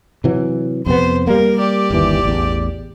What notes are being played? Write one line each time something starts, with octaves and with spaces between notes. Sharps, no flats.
C3 E3 F#3
F2 C3 B3 C5
G3 A#3 A#4
G4 D5
G1 D#2 E3
A1 E2